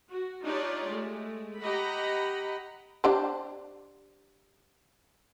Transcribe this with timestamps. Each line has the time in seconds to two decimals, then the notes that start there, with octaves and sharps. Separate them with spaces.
0.10 F#4
0.43 D4 D#4 F4 G4 C#5 D5
0.87 G#3 A3
1.62 G4 D#5 F#5 A#5 B5
3.04 D4 G4 C5